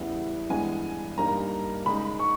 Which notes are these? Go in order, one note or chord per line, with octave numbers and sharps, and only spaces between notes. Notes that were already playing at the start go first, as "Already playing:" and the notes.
Already playing: E2 C#3 G3 B3 E4
G2 E3 G#3 B3 G#5
G2 G3 A#3 D#4 A#5
C#3 G#3 D#4 B5
C#6